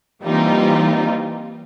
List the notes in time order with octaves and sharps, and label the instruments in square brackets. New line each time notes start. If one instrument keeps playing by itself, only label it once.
[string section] E3 G3 A#3 C4 D#4 F4